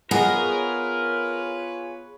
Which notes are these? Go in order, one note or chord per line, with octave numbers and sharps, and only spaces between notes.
B3 F4 G#4 A#4 B4 C#5 D#5